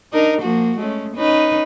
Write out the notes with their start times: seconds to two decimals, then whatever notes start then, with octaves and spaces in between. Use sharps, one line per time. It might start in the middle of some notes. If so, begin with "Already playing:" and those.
0.12 D4 D#4 A#4
0.41 F3 A#3 F#4
0.77 G#3 A3 C#4
1.15 C#4 D#4 B4